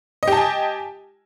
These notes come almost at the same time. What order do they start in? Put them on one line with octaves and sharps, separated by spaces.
D#5 G4 A5 G#5